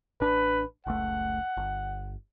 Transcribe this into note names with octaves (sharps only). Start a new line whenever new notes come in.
A1 D4 B4
F#1 C#2 A3 F#5
G1